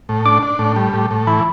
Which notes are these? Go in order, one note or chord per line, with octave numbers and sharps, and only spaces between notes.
A2
D4 D6
D4
A2
G3
A2
A2
E3 B5